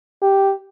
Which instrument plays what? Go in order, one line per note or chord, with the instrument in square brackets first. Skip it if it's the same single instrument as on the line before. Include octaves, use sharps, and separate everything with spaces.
[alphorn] G4